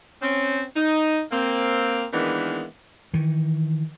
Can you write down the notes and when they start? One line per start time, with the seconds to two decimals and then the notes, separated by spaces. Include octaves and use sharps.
0.22 C4 C#4
0.76 D#4
1.32 A#3 C4
2.13 D#3 E3 G#3 A#3 B3 D4
3.14 D#3 E3